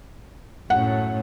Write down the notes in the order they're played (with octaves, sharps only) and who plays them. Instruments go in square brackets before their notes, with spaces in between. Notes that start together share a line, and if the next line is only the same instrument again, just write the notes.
[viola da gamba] F#2 A2 [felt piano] F#5